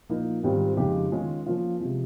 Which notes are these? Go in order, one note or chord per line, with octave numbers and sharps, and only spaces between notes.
A#2 F3 A#3 D#4
G#2 D#3 G3 C4 F4
F2 C#3 G#3 D#4 G4
D#3 G#3 C#4 F4 G#4
F3 A#3 C#4 F4
C3 F3 G#3